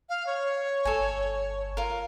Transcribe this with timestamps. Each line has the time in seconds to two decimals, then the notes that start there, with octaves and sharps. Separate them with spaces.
0.09 F5
0.27 C#5
0.85 G1 A4 G#5
1.77 F4 A#4